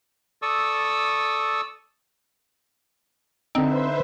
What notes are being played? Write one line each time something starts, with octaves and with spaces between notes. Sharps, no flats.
A4 D5 C#6 D#6 E6
D3 C4 D#4 B4 C5 E5